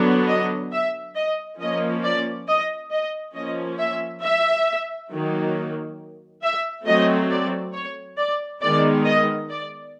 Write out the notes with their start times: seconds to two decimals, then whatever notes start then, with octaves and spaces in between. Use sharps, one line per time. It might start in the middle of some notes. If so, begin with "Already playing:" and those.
Already playing: D3 F#3 B3 D4
0.29 D#5
0.72 E5
1.16 D#5
1.61 F3 A#3 C#4 D#5
2.04 D5
2.48 D#5
2.91 D#5
3.35 F3 A#3 C#4 D#5
3.79 E5
4.23 E5
5.11 D#3 F#3 A#3
6.43 E5
6.86 F#3 A3 C4 D#5
7.30 D5
7.74 C#5
8.18 D5
8.62 D#3 G#3 B3 D5
9.06 D#5
9.50 D5